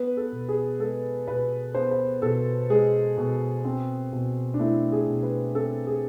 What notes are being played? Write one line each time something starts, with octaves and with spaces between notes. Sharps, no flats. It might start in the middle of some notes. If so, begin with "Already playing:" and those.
Already playing: B3 B4
A4
B2
G#4
G#3 A4
B2 B4
B3 C5
C5
B2 A4
G#3 G#4
B2
C4
B2
D4
A3 E4
G#4
B2
B4
C4 A4
G#4